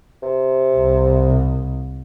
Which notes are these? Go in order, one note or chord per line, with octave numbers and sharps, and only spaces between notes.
C3
C2